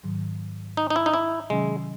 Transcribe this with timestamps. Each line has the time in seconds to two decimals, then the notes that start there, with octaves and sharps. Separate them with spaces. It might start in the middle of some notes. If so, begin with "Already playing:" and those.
0.03 G#2 D#3 F#3
0.77 D#4
0.90 D#4
0.96 E4
1.06 D#4
1.14 E4
1.50 C3 D#3 F#3 G#3 C#4